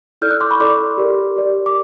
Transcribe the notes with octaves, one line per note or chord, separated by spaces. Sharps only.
E4 A4 D5 F6 G6
E6 F#6
C6 D6
B5 C#6
E4 A4 D5 C6 D6
G4 A#4 D5
G4 A#4 D5
D6